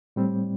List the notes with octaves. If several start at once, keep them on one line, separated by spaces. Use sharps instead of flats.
A2 G3 C4